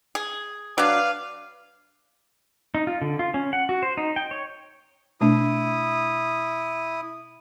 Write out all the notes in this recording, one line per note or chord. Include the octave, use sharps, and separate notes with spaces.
G#4
F#3 D4 B4 D5 F5
D#4
F4
D3
F4
C#4
F#5
F#4
C5
D#4
G5
C#5
B2 A3 D4 E4 D#6